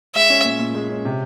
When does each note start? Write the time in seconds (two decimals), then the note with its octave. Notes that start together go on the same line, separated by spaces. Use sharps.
0.15 G#3 E5
0.30 C#4
0.45 A#2
0.59 A#2
0.75 G#3
0.89 C#4
1.05 C3